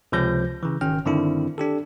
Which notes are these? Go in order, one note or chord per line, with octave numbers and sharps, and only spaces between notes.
C#2 C3 F3 G6 A#6
C#3 E3
G#1 D#3 C#4 G5 F6
G2 D3 D#3 C4 D4 E4
D4 G4 A4